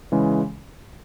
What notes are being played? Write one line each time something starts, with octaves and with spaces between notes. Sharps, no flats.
C#3 E3 G#3